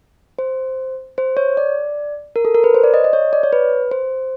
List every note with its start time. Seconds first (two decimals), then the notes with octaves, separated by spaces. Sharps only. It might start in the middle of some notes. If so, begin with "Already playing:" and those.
0.39 C5
1.18 C5
1.37 C#5
1.57 D5
2.36 A#4
2.45 A4
2.55 A#4
2.64 B4
2.74 C5
2.84 D5
2.94 D#5
3.04 D#5
3.13 C#5
3.33 D5
3.43 C#5
3.53 B4
3.91 C5